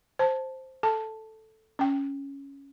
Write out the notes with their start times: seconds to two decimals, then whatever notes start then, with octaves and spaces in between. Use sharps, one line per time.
0.19 C5 A5
0.83 A4 A5
1.79 C#4 G5